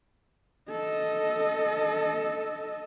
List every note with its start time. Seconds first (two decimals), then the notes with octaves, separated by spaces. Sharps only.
0.71 A4 D#5